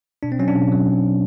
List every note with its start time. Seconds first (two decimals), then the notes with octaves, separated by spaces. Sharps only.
0.23 B2 D4
0.32 C4
0.39 F#3 C#4
0.48 D4
0.56 B2
0.71 F#3